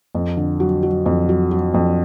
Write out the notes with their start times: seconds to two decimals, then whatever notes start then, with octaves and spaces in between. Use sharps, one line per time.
0.15 F2
0.37 D3
0.60 F#3
0.83 F#3
1.06 F2
1.29 F#3
1.51 F#3
1.74 F2